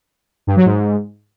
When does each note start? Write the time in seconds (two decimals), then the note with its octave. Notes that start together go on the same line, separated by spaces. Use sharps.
0.47 G2
0.56 F#3
0.66 G#2